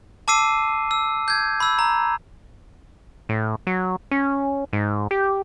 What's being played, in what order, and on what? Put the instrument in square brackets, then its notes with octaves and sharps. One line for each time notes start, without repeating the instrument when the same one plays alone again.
[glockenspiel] A5 D6 E6 C7 D#7
E6
G6 G#6
B5 E6
A#5
[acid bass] A2
F#3
C#4
G#2
G4